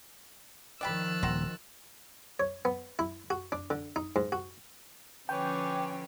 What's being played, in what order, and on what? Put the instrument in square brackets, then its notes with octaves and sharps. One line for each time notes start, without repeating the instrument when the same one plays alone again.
[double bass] D#3 F3 [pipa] D5 G5 B5 [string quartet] E6 F#6 A6
[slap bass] D#1 [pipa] C4 F#4 A#5
[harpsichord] C#5
B3
E4
F#4
D4
D3
D#4
G#2
F#4
[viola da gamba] D3 F3 C#4 [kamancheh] B4 C#5 [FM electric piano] G5 [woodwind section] G#5 D6